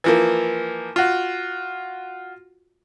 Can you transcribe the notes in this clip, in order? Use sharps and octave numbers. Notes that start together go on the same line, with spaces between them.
E3 F3 A#3
F4 F#4